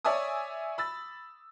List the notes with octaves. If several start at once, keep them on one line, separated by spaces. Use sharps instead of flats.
C#5 D5 E5 G#5 D#6
B5 E6 A6